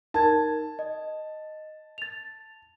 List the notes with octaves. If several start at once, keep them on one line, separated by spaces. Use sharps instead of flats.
D#4 A#4 A5 G#6
D#5
A6 F7